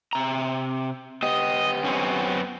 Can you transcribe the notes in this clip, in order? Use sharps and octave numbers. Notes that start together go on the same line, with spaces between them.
C3 A#5
B3 G4 D#5
F#2 C4 C#4